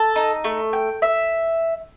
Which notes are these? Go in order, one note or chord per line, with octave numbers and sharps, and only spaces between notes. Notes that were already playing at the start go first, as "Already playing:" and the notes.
Already playing: A4
D#4
A3
G5
E5